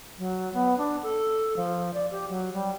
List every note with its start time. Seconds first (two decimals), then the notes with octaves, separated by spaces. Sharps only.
0.18 F#3
0.54 B3
0.78 D4
1.03 A4
1.56 F3
1.94 D5
2.11 G4
2.29 F#3
2.54 G3